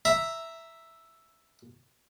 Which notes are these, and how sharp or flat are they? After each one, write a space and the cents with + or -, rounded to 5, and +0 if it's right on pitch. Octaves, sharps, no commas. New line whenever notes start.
E5 +0 A#5 +0